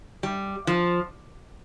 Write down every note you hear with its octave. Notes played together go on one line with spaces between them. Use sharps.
G3
F3